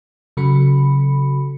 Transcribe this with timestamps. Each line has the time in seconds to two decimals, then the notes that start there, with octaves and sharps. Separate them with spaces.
0.37 C#3 F#3 F#4 A4 B5 C#7